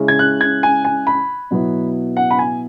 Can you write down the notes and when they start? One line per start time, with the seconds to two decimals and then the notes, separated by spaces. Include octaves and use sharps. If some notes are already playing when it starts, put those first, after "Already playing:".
Already playing: C#3 G#3 C#4 E4
0.08 G#6
0.19 F#6
0.41 G#6
0.63 G#5
0.85 G#5
1.07 B5
1.51 B2 F#3 B3 E4
2.17 F#5
2.31 B5
2.39 G#5